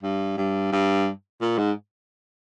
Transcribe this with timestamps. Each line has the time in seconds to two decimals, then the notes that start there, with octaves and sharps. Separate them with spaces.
0.03 G2
0.37 G2
0.72 G2
1.41 A#2
1.58 G#2